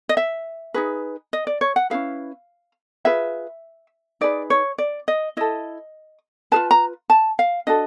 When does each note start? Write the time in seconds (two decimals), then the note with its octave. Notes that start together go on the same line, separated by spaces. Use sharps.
0.09 D#5
0.17 E5
0.74 D#4 G#4 B4
1.33 D#5
1.47 D5
1.61 C#5
1.76 F#5
1.90 C#4 E4 G#4 B4 F5
3.05 F4 G#4 B4 E5
4.21 D#4 G#4 B4 D5
4.50 C#5
4.78 D5
5.08 D#5
5.37 E4 A4 D#5
6.52 F4 G#4 B4 A5
6.71 A#5
7.10 A5
7.39 F5
7.67 D4 F#4 A4 D#5